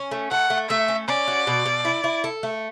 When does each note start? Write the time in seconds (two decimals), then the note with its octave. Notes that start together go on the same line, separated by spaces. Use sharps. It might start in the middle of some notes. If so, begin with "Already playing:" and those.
Already playing: C#4
0.11 A3
0.31 A3 F#5
0.50 A3
0.69 A3 E5
0.88 C#4
1.08 C#4 D5
1.28 F#4
1.47 B2
1.66 B2
1.85 E4
2.04 E4
2.24 A4
2.43 A3